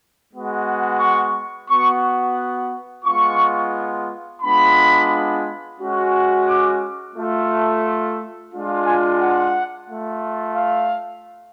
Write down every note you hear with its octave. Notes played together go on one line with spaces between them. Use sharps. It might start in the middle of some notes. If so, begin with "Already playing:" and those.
G#3 B3 F#4
C#6
B3 F#4 C#6
G#3 B3 F4 C#6
G#3 B3 D4 F4 B5
G#3 C#4 F#4
D6
A3 F4
G#3 D4 F4
G#5
F#5
A3 F4
F5